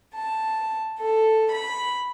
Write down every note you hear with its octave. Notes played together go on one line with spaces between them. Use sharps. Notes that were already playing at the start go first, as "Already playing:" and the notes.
A5
A4
B5